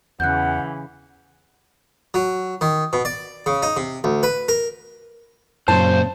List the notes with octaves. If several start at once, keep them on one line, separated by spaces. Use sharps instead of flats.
E2 C#3 E3 F#5 F#6 G6
F#3
D#3
B2
D5
C#3
D#4
C3
D2
B4
A#4
F#2 A#2 C#3 F#3 C5 A5